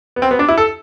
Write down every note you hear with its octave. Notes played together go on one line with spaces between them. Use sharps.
B3
C4
B3
D4
E4
A4